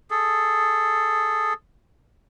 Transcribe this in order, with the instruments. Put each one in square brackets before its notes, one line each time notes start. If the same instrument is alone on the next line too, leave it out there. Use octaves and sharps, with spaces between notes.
[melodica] G#4 A4